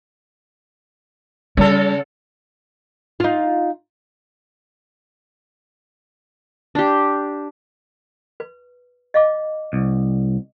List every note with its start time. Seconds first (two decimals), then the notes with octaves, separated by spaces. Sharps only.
1.57 C#3 G3 A4
3.20 D#4 F4
6.75 D4 G4
8.40 B4
9.14 D#5 F5 D6
9.73 C2